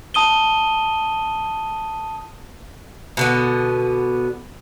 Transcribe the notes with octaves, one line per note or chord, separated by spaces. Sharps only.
A5 D#6 D#7 G7
B2 D3 B3